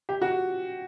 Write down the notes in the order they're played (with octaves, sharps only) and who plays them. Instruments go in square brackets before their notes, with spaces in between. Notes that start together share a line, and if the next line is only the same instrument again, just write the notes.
[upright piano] G4
F#4